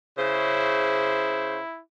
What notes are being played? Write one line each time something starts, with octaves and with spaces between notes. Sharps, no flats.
C#3 E4 C5